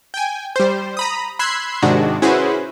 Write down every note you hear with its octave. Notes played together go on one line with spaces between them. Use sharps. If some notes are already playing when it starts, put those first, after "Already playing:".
G5 G#5
G3 C5
A#5 B5 D#6
B5 C6 E6 F#6 G#6 C7
G#2 C3 D#3 G#3 D4 F#4
C#4 E4 F#4 G#4 B4 C5